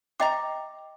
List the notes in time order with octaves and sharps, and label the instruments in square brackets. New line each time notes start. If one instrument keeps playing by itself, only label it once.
[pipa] C5 A#5 [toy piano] D#5 G5 D6